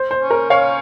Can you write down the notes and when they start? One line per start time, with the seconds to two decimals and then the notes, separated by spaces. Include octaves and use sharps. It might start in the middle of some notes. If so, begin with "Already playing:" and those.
Already playing: C5
0.11 C5
0.20 C#4
0.30 A#4
0.50 C#4 C#5 F5